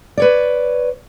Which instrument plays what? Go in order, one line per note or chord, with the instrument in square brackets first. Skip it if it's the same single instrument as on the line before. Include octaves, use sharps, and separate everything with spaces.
[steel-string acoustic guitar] B4 C#5 D5